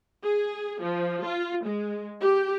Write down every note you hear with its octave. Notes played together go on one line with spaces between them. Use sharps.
G#4
F3
F4
G#3
G4